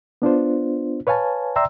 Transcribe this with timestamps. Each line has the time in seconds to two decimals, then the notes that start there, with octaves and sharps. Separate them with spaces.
0.22 B3 D4 F4 C5
1.07 B4 C#5 F5 G#5 A5
1.56 D5 E5 G5 A#5 C6 E6